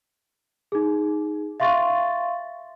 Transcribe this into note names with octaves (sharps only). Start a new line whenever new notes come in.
D#4 G#4
E5 F5 C6 C#6 A6